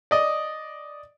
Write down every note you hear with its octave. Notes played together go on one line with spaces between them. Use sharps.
D5 D#5